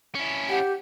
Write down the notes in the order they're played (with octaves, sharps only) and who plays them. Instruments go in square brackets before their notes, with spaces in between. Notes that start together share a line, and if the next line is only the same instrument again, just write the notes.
[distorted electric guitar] C#4 E4
[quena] G4 [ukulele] F#5 G5